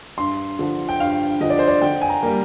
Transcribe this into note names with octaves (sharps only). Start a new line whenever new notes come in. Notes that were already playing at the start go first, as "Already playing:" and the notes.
G2 C6
D3 F3
G5
G2 F5
D3 F3 D#5
D5
C5
D5
D3 G5
G#5
A#5
G3 A#3